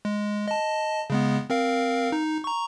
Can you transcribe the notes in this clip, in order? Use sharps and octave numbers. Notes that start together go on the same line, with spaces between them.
G#3
D#5 A5
C#3 G#3 B3
C4 A#4 F5
D#4
A#5 C#6